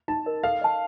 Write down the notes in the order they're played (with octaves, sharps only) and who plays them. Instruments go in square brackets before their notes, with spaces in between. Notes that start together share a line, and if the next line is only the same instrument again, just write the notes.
[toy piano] D#4 [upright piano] A5
[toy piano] A#4 D#5
[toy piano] A4 [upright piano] F5
[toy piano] D#5 A5